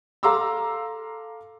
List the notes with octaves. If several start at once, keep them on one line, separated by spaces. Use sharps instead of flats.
A4 F5 A#5 C6 D6 E6